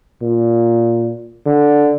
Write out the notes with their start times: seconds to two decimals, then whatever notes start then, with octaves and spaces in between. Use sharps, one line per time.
0.22 A#2
1.46 D3